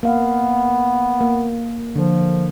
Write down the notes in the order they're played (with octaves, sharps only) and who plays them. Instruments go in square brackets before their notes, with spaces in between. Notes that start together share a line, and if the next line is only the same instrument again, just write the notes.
[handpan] A#3 F5 [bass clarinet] B3
[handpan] A#3
[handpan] D3 [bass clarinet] F3